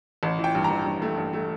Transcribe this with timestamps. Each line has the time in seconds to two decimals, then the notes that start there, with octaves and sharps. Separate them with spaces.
0.23 A1
0.39 E3
0.44 G5
0.55 G2
0.64 A#5
0.70 A1
0.86 G2
1.02 A3
1.17 G2
1.33 A3